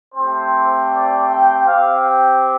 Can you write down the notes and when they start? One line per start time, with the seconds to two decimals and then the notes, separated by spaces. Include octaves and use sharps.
0.14 A3 C4 G4 C5
0.91 D5
1.28 G5
1.67 C4 G4 F5
2.05 G5